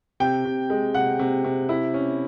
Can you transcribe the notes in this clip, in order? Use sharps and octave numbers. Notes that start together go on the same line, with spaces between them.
C3 G5
C3
G#3
C3 F#5
C3
C3
E4
C#4